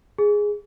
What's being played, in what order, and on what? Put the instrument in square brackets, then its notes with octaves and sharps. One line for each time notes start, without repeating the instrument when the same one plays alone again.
[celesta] G#4